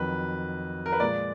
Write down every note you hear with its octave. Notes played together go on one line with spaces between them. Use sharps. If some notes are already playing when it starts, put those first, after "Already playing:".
Already playing: F2 D#3 F#3 B4
A#4
B4
A#2 F3 G#3 D5